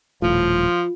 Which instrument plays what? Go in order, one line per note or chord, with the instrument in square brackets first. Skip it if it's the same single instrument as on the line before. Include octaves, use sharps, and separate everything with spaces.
[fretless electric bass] D#1 A2 [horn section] F3 [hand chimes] F4